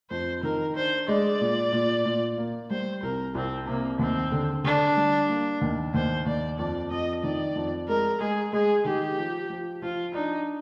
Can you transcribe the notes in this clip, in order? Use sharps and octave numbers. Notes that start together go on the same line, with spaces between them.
F2 C5
D#3 A#4
D4 C5
G#3 D5
A#2
A#2
A#2
A#3
G3 C5
C2 A#4
C2 C4
C3 A#3
D#2 C4
D3
D3 D4
G3
A#3
D#2
D#2 C5
D#2 D5
F2 D5
F2 D#5
D#3 D5
F2
G#3 A#4
G#3 G#4
G#3 G#4
D#3 G4
F3
F3
F3 F4
D4 D#4